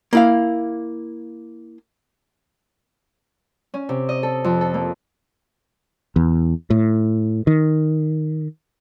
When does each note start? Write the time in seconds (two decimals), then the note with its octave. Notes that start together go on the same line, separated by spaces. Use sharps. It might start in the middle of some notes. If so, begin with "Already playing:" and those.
0.13 A#3 E4 F5
3.74 C#4
3.89 C3
4.09 D#5
4.23 A4
4.44 F2
4.61 A4
4.74 A#3
6.16 E2
6.70 A2
7.47 D#3